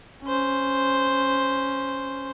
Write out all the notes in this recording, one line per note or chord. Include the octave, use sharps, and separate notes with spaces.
C#4 C5